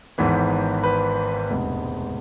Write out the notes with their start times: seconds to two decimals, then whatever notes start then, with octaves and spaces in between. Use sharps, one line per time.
0.18 G#1 G#2 E3 B3
0.84 B4
1.50 E1 D2 C3 G#3 B3